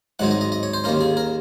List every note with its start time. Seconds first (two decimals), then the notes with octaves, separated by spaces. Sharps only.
0.19 G#2 D#3 F#3 C4 D#4 F#5
0.31 D#5
0.41 D#5
0.52 D#5
0.63 C#5
0.74 C5
0.84 D#2 D#3 A#3 C#4 A#4
1.01 G#4
1.17 A#4